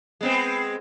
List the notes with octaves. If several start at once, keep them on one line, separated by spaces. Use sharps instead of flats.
G#3 B3 C4